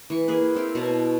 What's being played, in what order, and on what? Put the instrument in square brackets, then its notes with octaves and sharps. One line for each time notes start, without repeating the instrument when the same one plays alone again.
[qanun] E3 C#6
A#3 G#4 B4
C4 E4 F5 G5
B2 C#5 A5